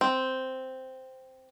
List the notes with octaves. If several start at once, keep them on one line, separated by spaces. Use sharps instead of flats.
C4